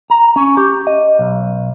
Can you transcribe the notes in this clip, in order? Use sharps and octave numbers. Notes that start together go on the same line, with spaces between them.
A#5
C#4
G4
D#5
B1